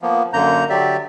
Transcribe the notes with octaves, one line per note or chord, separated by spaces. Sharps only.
F3 A#3 B3
F#2 D3 A#3 A#5 G6
D3 F#3 G4 D5 E5